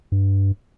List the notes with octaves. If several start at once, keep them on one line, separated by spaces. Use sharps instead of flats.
G2